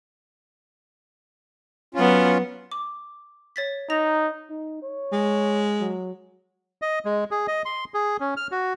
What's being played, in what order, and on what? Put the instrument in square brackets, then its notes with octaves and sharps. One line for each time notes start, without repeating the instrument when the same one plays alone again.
[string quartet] F#3 B3 [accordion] C#4 F4
[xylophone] D6
C#5 A6 B6
[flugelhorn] D#4 [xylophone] A#5 A#6
[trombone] D#4
C#5
[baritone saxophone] G#3
[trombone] F#3
[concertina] D#5
G#3
G#4
D#5
C6
G#4
C#4
F6
F#4